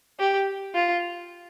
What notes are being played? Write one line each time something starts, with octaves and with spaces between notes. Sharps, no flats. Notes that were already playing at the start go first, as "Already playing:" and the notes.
G4
F4